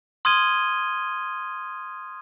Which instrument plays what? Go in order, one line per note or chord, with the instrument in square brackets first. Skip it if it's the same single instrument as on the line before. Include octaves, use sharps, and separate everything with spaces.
[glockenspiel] C6 D#6 F6 G#6 D#7 G7